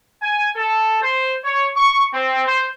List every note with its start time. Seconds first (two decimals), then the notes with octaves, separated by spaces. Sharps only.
0.22 G#5
0.56 A4
1.02 C5
1.44 C#5
1.76 C#6
2.13 C4
2.45 C5